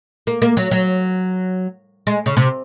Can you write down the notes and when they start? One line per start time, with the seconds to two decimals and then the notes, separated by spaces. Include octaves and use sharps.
0.27 A#3
0.42 A#3
0.57 F#3
0.71 F#3
2.07 G#3
2.26 C#3
2.37 C3